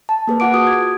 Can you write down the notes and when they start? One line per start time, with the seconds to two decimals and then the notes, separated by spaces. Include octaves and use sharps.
0.09 A5
0.27 A#3 G#4 B4
0.40 F4 F#5 D6 D7
0.54 F#4 D#6
0.67 G#6